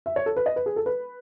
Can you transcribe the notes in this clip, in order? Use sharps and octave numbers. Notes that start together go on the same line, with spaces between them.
E5
C#5
A4
B4
D#5
B4
G#4
A4
B4